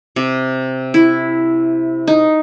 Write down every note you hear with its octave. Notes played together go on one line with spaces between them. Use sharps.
C3
E4
D#4